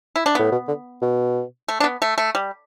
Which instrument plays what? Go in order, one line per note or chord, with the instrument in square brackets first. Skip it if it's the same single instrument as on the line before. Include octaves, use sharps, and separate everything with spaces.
[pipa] E4
D4
[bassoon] A2 [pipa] B3
[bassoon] B2
D3
B2
[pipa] A3
D4
B3
A3
A3
G3